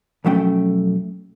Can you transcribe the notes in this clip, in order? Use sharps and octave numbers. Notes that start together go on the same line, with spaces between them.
B1 F2 F#3 A3 C#4 G5